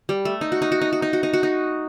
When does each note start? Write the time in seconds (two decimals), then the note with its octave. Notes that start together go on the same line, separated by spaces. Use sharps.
0.09 G3
0.25 A3
0.41 D#4
0.52 F#4
0.62 D#4
0.72 F#4
0.82 D#4
0.93 F#4
1.02 D#4
1.13 F#4
1.23 D#4
1.33 F#4
1.43 D#4